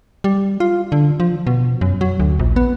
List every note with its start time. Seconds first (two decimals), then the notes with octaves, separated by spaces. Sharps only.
0.24 G3
0.60 F4
0.92 D3
1.20 F3
1.47 B2
1.81 F#2
2.01 F#3
2.20 D2
2.39 A#1
2.56 B3